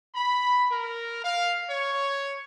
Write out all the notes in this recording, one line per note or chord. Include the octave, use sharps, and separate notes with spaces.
B5
A#4
F5
C#5